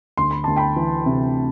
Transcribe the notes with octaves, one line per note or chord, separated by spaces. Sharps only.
D2 C6
B5
D2 A5
G5 B5
E3
C3